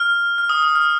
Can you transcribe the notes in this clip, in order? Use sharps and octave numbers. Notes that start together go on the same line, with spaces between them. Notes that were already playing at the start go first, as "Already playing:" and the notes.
Already playing: F6
F6
D#6
D#6
F6